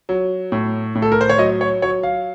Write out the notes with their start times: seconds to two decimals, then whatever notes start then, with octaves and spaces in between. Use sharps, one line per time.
0.09 F#3
0.52 A2
0.95 A2
1.02 A4
1.12 A#4
1.21 C5
1.29 C#5
1.38 F#3 D#5
1.61 C#5
1.82 F#3 C#5
2.03 F5